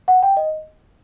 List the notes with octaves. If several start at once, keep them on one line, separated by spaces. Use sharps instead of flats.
F#5
G5
D#5